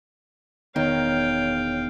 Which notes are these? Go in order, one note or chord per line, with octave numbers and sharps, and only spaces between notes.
E1 D#3 B3 C#5 F5 G5